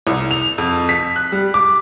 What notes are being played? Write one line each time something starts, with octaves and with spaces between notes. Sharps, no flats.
C2
F7
F2
B6
F#6
G3
D6